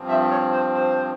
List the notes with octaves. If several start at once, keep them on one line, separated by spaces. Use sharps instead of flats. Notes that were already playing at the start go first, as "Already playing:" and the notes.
Already playing: G2 F3 C4
E5
C#5
C5
C5